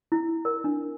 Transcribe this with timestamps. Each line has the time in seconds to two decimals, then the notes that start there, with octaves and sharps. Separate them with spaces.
0.12 E4
0.45 A#4
0.64 D4